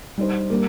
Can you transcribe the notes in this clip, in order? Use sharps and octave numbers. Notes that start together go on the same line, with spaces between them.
G3 D#4 C5
G3 A#3